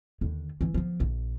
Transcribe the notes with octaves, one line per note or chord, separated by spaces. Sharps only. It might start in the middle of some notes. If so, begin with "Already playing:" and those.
D#2 D3
E3 F3
F3 B3
A#1